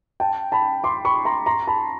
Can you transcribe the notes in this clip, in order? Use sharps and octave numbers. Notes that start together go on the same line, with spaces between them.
G5 A5
A5 B5
C6 D6
B5 C#6
A#5 C6
A#5 C6
A5 B5